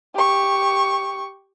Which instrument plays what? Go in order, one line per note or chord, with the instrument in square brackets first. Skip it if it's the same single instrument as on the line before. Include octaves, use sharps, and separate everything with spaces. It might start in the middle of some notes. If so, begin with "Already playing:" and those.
[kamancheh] G4 C#6